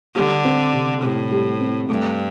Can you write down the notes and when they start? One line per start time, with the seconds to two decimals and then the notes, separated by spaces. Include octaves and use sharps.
0.15 D3 G3
0.45 C4
0.73 C3
1.02 A2 C3
1.31 G3
1.61 C4
1.89 G2 A3